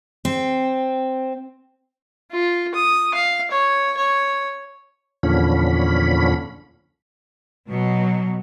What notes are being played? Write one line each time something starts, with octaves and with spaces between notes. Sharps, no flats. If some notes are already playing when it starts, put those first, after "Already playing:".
C4
F4
D#6
F5
C#5
C#5
E2 A#2 D3 F3 C#4 B5
B2 F#3